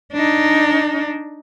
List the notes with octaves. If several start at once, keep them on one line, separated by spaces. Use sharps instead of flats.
D4 D#4